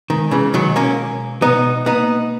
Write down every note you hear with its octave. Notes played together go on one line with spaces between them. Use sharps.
D#3 G#3
C#3 E3
B2 D#3 F#3
A#3 C#4
B2
B2 B3 D#4
A#3 B3 D#4